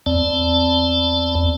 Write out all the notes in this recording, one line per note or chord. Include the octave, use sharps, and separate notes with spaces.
E2 C4 D5 A5